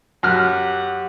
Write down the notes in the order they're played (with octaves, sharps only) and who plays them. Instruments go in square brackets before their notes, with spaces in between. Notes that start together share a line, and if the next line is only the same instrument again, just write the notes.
[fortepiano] F#2 F6 F#6 [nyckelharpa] G4 F#5